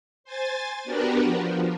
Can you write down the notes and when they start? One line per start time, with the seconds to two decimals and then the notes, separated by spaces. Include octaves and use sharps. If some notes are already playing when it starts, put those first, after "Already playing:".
0.24 C5 G#5 A6
0.84 B3 D4 F#4 G4 A#4 B4
1.23 F3